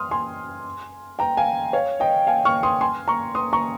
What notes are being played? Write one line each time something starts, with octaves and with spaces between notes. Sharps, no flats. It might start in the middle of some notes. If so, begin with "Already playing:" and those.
Already playing: C6 D#6 F6
G#5 C6
G5 A#5
F5 G#5
C#5 F5
D#5 G5
F5 G#5
C#6 F6
C6 D#6
G#5 C6
A#5 C#6
C6 D#6
A#5 C#6